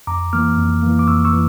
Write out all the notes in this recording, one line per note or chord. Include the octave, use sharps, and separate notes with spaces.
F2 A#5 D6
E3 A#3 D6 F6
F2
E3 A#3
D6
F2 C#6 E6
C#6 E6
E3